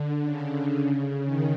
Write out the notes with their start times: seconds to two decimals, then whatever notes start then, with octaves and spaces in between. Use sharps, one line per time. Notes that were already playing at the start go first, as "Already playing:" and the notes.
Already playing: D3
0.23 C#3
1.25 D#3